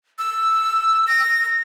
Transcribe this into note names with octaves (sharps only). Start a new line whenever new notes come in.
E6
A#6